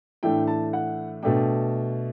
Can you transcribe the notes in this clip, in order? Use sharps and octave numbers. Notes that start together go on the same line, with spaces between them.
A2 E3 A3 D4 G5
A5
F#5
B2 A3 D4 G5